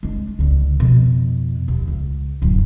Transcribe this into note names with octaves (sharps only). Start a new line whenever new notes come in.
G#3 D4
C#2 D3
F2 B2
D#2
C#2
D1 F#2